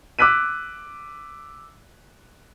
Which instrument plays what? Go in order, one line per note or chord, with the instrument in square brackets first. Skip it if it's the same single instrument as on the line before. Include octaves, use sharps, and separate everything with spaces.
[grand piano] D6 E6 F#6 B6 D#7